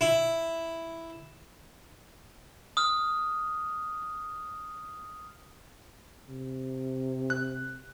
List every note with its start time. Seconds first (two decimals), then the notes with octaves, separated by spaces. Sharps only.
0.01 E4
2.77 D#6 F6
6.29 C3
7.30 F#6